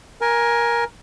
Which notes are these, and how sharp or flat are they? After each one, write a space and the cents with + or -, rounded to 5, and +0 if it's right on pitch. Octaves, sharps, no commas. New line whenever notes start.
A#4 +15 G#5 +0